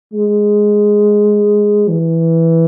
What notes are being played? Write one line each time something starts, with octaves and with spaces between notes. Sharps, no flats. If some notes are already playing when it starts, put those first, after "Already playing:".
G#3
E3